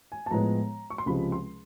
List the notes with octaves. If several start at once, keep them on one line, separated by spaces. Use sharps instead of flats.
G#5
A5
A2 F3 G#3 B3 A#5
C#6
C6
C#2 C3 F3 G#3 B5
C6